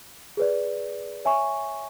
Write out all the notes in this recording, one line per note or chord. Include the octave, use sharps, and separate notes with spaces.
G#4 B4 D5
C#5 E5 G#5 C#6